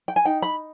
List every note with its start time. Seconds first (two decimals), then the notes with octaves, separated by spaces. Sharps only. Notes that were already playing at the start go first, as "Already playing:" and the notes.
0.08 G5
0.16 G#5
0.25 D#4 G5
0.42 B5